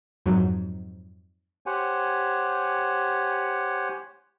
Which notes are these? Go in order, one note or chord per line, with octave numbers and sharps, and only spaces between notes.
F2 G#2 F#3
G4 C5 C#5 F#5 G#5